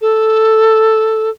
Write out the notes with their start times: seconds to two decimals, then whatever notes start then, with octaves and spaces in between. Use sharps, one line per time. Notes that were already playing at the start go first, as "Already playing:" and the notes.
0.01 A4